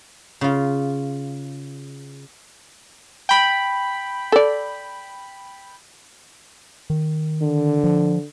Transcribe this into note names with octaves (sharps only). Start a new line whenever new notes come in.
C#3 F4
G5 B5
A4 D5
D#3
D3
F3